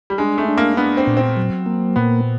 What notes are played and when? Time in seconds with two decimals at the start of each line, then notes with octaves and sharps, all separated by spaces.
0.10 G3
0.18 G#3 D4
0.38 A3
0.48 D4
0.58 A#3
0.77 B3 D4
0.97 C4
1.07 A#2
1.17 C4
1.37 F#3
1.66 A#3
1.96 A#2 B3